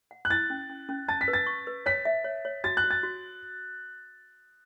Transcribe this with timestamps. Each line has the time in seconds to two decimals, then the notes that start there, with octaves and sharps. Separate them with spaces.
0.11 F#5
0.25 F#6
0.30 E4 A6
0.50 C#4
0.70 C#4
0.89 C#4
1.09 A5 A6
1.21 B6
1.28 B4
1.33 A6
1.47 C#6
1.67 B4
1.86 C#5 B6
2.05 E5
2.24 C#5
2.45 C#5
2.64 F#4 A6
2.77 F#6
2.84 F#4
2.90 A6
3.03 F#4